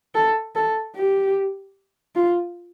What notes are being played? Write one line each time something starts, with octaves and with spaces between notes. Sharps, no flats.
A4
A4
G4
F4